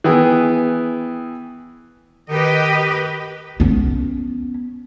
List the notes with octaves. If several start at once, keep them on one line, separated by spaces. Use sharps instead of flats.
E3 B3 G#4 G5 D#6
D#3 G4 B4 D#5
B3 C#4